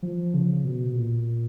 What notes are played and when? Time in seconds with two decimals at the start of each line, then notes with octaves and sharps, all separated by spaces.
0.02 F3
0.34 C#3
0.64 B2
0.89 B2
0.96 A#2